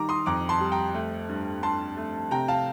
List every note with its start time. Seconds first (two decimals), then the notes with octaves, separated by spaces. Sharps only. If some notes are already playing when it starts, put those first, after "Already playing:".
Already playing: D#3 G3 A#5 D6
0.09 C6 D#6
0.26 F2 A#5 D6
0.49 A5 C6
0.61 G3
0.72 G5 A#5
0.94 A3
1.29 G2
1.63 G2 A5 C6
1.97 A3
2.31 C3 G5 A#5
2.48 F5 A5